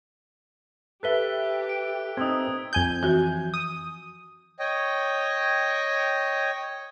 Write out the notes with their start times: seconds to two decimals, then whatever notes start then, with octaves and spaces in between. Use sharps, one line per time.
1.03 G4 A4 B4 E5 F#6 B6 G7
1.69 D7
2.17 C4 D#4 D#6 E6 G#6
2.73 F2 G#5 G6
3.03 E3 F#4
3.54 D#6
4.59 C#5 D#5 G5